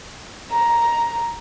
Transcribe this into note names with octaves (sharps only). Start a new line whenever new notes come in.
A#5